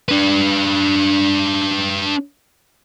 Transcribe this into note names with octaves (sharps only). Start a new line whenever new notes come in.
D4 B4